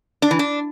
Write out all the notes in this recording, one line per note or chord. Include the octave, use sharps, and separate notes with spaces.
D4
E3
D4